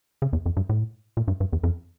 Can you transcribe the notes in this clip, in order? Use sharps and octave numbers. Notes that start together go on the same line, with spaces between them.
C#3
E2
F2
G2
A2
A#2
G2
G2
E2
F2